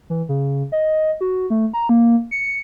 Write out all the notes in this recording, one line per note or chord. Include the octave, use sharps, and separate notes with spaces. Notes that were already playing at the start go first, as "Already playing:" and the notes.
E3
C#3
D#5
F#4
A3
A#5
A#3
C#7